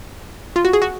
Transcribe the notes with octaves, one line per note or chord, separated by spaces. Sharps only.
F4
F#4
G#4
F#4